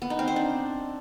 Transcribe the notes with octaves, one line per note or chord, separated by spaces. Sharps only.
B3
D#4
C4
C5
D4